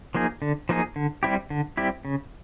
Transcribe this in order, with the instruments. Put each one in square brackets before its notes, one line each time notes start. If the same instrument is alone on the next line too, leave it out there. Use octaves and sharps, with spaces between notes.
[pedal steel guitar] F3 A#3 D#4 G#4
D3
F3 A#3 D#4 G#4
D3
G3 C4 E4 G4
D3
G3 C4 E4 G4
C#3